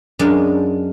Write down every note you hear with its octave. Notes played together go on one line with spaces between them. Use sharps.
F#2 G#3 D4 F5